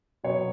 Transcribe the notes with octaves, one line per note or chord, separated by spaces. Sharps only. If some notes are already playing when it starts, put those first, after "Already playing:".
B2 F#3 B3 C#5